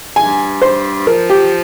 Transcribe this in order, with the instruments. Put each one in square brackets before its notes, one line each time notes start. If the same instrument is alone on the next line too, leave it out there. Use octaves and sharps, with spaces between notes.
[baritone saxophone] G2 [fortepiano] G#5
[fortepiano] C5
[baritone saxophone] F3 [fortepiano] A#4
[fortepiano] G4